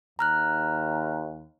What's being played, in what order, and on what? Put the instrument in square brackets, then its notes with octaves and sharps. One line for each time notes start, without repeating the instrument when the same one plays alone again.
[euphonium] D#2 [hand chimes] A#5 F6 F#6